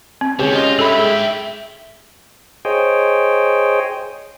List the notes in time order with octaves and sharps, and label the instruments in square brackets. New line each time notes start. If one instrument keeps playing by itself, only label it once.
[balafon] C4
[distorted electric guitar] D3 D#3 [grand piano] G#3 C#4 G4
[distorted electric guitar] F4 [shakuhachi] D#5
[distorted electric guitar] G2 [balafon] A4 B5 [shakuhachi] E5
[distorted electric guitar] G#2 G5 [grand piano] G#3
[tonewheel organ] G#4 C5 C#5 D#5 G5